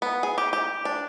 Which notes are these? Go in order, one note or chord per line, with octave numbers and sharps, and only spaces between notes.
B3
G#4
G4
G4
D4